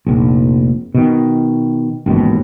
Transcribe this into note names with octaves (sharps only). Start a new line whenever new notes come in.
F1 A#1
B2 D#3
A1 D#2 G#2 B2